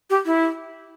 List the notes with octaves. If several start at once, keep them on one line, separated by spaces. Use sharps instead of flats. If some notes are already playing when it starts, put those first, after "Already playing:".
G4
E4